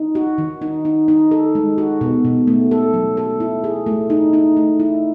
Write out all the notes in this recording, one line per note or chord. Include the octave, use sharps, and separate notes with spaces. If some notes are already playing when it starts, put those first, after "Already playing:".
Already playing: D#4
F#4
D#3
D#4
D#4
D#4
A4
G#3
F#4
B2
B2
A3
A4
F#3
A4
E4
G#4
A3
D#4
D#4
A3
E4